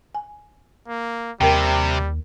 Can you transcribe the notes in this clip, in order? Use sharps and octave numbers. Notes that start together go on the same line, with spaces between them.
G#5
A#3
D#2 C3 G3 A#4 G5